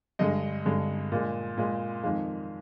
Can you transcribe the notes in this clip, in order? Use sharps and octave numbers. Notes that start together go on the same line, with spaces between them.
G2 D3 G#3 D#5
G2 D3 G#3
A#2 G#3
A#2 G#3
F2 D#3 G#3 F5